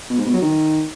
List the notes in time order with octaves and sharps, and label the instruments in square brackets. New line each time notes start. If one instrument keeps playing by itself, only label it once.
[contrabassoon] B2
G#2
B2
F#3
D#3